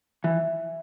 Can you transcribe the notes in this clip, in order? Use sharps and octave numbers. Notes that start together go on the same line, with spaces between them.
E3 E5